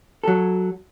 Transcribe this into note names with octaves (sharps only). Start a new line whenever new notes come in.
F#3 A4